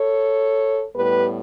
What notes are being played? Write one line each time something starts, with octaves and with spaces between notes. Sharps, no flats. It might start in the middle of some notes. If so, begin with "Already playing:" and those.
Already playing: A4 C#5
A2 G3 B3 G4 B4